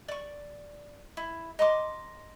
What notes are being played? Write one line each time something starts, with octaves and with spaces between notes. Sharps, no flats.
D5 C#6
E4
D#5 A#5 C6 D6